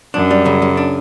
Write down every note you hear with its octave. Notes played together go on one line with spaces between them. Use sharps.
F#2 D4
G3
C#3
C#3
D4